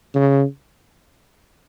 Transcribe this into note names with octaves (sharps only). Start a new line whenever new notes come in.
C#3